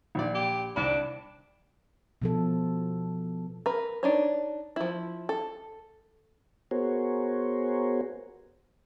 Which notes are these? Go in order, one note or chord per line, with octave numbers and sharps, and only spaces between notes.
A#1 A#2 D5
G4
C2 D4 B5
B2 F3 A4
A#4 B4
D4 D#4 C#5
F3 E4
A4
B3 F#4 G#4 A#4 C5 C#5